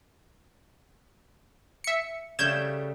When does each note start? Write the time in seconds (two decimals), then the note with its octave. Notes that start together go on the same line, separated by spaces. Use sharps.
1.84 E5 C#7
2.39 C#3 G3 A3 G6 G#6 E7